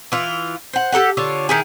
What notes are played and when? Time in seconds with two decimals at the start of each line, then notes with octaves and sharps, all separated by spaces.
0.12 E3 F4
0.73 C5 F#5
0.92 G4 A4 A#4 F#5
1.17 D3 F4 C#5
1.49 D#3 E4 G#4